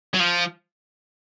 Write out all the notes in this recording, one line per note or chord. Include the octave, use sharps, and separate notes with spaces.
F#3
F3